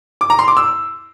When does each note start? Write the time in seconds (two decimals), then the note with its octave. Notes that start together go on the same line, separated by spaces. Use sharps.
0.21 D6
0.30 A#5
0.39 C6
0.48 D6
0.57 E6